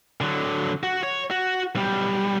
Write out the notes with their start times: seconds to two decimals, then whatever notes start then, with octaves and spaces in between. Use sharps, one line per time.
0.21 D3 F#3
0.83 F#4
1.03 C#5
1.31 F#4
1.75 B1 G3